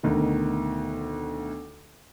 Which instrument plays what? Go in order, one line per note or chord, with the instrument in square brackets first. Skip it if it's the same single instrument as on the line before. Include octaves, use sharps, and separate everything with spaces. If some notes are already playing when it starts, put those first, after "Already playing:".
[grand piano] D2 B2 D#3